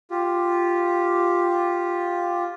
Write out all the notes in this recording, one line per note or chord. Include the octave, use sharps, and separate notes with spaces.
F4 G4